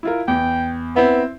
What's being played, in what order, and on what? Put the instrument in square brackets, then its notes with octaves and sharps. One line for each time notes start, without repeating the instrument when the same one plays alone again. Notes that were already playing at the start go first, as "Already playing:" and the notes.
[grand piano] E4 F4 A#4
[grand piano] E2 [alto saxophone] G5
[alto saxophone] B3 [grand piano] C4 E4 E5